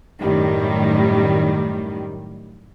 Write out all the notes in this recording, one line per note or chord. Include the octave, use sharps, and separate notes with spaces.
F#2 A2 D#3 G3